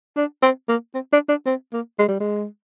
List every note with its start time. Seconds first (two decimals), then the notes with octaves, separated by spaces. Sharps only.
0.17 D4
0.43 C4
0.68 A#3
0.95 C4
1.13 D4
1.29 D4
1.46 C4
1.73 A#3
1.99 G#3
2.09 G3
2.20 G#3